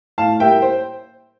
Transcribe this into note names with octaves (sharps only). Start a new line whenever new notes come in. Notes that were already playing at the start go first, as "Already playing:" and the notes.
A2 F5 A5
G3 A#3 E4 E5 G5
C5